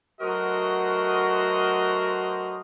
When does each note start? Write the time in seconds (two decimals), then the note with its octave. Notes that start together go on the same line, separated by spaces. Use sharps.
0.20 F#3 A3 F#4 A#4 C5 D#5